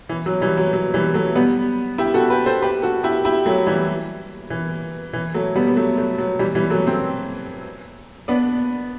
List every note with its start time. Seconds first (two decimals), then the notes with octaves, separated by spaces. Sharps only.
0.09 E3
0.26 F#3
0.41 E3 G3
0.57 F#3
0.73 F#3
0.94 E3 G3
1.14 F#3 A3
1.35 G3 B3
1.98 E4 G4
2.14 F#4 A4
2.30 G4 B4
2.46 A4 C5
2.62 G4 B4
2.82 F#4 A4
3.03 E4 G4
3.25 E4 G4
3.46 F#3 A3
3.66 E3 G3
4.50 E3
5.13 E3
5.34 F#3 A3
5.56 G3 B3
5.67 B3
5.76 F#3 A3
5.97 F#3 A3
6.18 F#3
6.39 E3 G3
6.55 E3 G3
6.70 F#3 A3
6.86 A3 C4
8.28 B3 D4